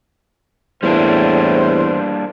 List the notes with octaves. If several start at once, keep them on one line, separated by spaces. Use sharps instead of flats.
E2 A2 G3 A#3 D4 C5